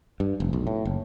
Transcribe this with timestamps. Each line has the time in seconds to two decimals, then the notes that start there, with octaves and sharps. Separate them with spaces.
0.20 G2
0.40 F1
0.53 B1
0.67 A2
0.85 F#1